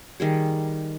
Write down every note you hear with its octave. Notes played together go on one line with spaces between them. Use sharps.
D#3 G3 G#4